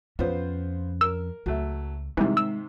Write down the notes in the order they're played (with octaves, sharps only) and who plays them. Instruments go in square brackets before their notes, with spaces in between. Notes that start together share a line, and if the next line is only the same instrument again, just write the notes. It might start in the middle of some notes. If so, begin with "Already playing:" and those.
[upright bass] F2 C#4 [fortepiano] B3 F4 C5
[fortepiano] A#4 [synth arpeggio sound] E6
[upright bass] C#2 [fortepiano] F#3 A3
[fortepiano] G#2 C3 D#3 [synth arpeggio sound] E3 G3 [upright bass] G#3
[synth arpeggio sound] E6